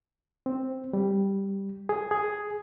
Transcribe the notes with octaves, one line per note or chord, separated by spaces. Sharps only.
C4
G3
G#4
G#4